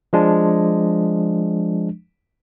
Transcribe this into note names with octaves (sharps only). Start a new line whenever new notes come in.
F3 G#3 D4